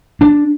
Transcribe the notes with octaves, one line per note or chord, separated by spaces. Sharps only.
D4